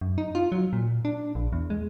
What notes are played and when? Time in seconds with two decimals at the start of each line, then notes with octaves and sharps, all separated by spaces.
0.01 F#2
0.18 D#4
0.35 F4
0.52 F#3
0.73 A#2
1.05 D4
1.35 A#1
1.53 E2
1.70 G#3